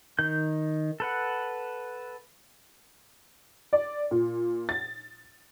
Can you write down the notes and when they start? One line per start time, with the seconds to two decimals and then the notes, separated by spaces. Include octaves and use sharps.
0.19 D#3 G6
1.00 A4 B4 F#5
3.73 D5
4.11 A#2
4.69 A6